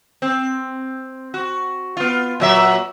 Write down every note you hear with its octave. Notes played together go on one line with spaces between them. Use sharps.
C4
F#4
B3 F4
A#2 F#3 E5